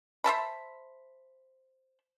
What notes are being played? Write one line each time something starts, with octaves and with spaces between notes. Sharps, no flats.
C5 E5 A5 B5